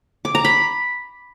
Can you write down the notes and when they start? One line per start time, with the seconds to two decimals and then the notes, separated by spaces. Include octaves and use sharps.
0.25 D6
0.35 A#5
0.45 B5